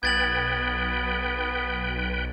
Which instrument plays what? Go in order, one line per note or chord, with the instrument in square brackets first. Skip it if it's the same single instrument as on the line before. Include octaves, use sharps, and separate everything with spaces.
[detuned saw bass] B1 [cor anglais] B3 [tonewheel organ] B4 G5 [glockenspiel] G#6 A6 F#7